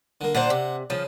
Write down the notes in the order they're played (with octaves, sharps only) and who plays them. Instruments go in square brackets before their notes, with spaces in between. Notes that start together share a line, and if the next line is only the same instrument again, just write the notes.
[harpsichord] D3 A#3
[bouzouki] A#2 D4 C5 [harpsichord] C4 F#5
[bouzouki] C3
[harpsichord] C#3 [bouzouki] F3